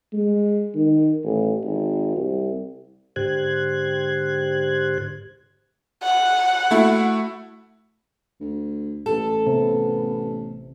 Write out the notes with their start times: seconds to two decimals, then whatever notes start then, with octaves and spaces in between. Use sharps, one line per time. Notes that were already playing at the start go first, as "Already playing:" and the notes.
0.13 G#3
0.75 D#3
1.23 A1
1.64 G#1
2.16 C2
3.16 G#2 D3 G4 C5 F#6 G#6
6.03 F#5
6.71 A3 E4 F#4
8.40 D2
9.06 A1 A4
9.47 C3 B3